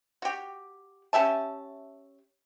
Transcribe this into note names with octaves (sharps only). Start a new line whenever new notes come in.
F#4 G4
C#4 G4 E5 A5